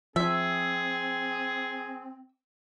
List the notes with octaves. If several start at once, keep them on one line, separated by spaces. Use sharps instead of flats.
F3 C4 G#4 E5